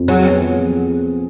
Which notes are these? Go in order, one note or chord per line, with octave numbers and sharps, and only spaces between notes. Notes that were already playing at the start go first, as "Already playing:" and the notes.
Already playing: F2
F#3 G#4
B3
F3